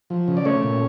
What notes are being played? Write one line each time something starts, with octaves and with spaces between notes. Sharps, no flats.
F3
C#3
D5
A3 C#4 C#5
A#2